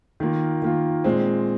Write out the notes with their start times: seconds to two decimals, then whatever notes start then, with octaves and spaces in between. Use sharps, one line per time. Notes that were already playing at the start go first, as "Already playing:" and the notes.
0.20 D#3 A#3 F4
0.62 D#3 A#3 F4
1.04 A#2 G#3 C4